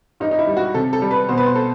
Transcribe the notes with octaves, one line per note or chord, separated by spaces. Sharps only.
G2 D#4
D#4
E4
G3
F#4
C3 A4
A4
G3
B4
B2 C5
B4
C5
A4